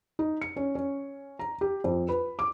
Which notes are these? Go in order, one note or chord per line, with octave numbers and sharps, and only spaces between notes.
D#4
C#7
C#4
C#4
A#5
G4
F2
B4
D6